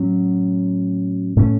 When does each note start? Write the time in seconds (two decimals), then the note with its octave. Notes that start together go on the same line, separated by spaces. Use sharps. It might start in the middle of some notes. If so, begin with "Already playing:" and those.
Already playing: A2 F#3 C#4
1.36 A2 A3 C#4